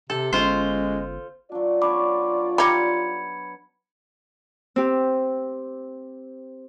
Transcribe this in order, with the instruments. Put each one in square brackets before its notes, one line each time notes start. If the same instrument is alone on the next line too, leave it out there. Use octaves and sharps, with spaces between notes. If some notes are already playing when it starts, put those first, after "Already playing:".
[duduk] C3 [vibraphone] G4 [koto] A4
[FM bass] G1 [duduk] G#3 [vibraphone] C#4 [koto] F4 C5
[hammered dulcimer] F#3 D4 [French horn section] F4 D5
[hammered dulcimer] B3 D4 C#5 [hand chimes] B5 D6
[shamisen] G3 D#4 [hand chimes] B5 G#6 C#7
[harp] C4 G4